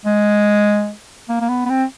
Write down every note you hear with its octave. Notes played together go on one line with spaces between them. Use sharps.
G#3
A#3
A#3
B3
B3
C4